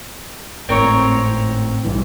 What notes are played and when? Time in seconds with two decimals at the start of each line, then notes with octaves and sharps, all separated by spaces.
0.69 G#1 A2 C4 A#4 C#5
1.85 B1 G2 E3